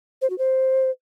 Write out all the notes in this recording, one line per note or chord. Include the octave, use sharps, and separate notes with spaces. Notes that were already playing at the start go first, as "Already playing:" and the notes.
C5
F#4
C5